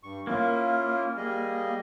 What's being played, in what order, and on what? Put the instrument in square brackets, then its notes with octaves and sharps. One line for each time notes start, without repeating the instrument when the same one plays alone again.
[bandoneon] G2 C#6
[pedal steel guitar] A#3 [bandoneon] C#4 E4 F4
[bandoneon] G3 G#4 D#5